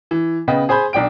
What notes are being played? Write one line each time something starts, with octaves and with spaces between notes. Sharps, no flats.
E3
C#3 B3 B4 D#5 G5
G#4 C5 G#5 B5 G6
B1 D4 G5 D7